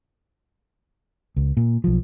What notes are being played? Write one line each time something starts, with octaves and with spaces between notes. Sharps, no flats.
C#2
A#2
B1 F3